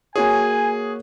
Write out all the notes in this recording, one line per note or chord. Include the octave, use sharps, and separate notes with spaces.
A#3 F#4 G#4 C#5 G#5